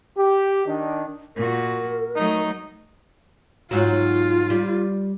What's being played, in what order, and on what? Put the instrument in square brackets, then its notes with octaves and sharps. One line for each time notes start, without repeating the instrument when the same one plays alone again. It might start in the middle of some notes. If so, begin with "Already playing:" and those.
[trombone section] G4
D#3 D4
[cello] A#2 F#4 [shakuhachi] A#4
[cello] F#3 A3 [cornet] D#4
[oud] G#2 F#3 [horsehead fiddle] F4
[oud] G3